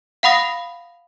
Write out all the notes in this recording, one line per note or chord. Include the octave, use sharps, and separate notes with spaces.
F5 F#5 B5 D#6 A#6